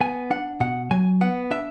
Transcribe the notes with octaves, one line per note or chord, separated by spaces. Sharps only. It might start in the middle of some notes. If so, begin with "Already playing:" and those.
B3 G#5
D4 F#5
B2 F#5
F#3 G#5
B3 F#5
D4 E5